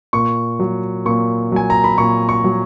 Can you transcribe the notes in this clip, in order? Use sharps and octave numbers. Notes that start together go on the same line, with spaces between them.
A#2 C#6
F#3
A#2 C#6
F#3 G#5
A#5
B5
A#2 C#6
C#6
F#3